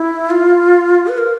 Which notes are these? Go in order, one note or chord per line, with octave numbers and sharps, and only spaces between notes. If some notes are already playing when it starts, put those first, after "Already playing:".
Already playing: E4
F4
B4
A#4